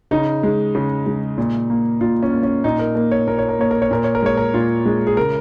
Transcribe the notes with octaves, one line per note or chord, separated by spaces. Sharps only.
C#3 D#4
G#3
C#3
G#3
A#2
A#3
A#2 F4
C#4
A#3
C#4
A#2 D#4
A#4
A#3 A#4
C#5
A#2 A#4
C#5
A#4
A#3 C#5
A#4
C#5
A#2 A#4
C#5
A#4
G#3 C#5
A#4
A#2 F4
G#3
G#4
C#3 A#4